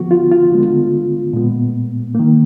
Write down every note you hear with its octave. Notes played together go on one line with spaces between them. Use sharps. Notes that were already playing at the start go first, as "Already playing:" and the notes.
Already playing: D3 F3 B3 F#4
F4
F4
D3 G#3 B3
A#2 G#3 B3
D#3 A#3